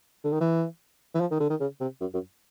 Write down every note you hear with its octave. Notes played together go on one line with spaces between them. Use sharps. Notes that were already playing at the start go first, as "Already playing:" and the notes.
D3
D#3
E3
E3
F3
D#3
D3
D#3
C#3
C3
F#2
F#2